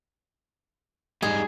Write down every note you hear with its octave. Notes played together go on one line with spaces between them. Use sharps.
G3 G#3 D#4 G#4